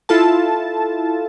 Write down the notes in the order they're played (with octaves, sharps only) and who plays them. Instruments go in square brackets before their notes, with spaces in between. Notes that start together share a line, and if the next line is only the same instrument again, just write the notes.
[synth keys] E4 F4 A4 A5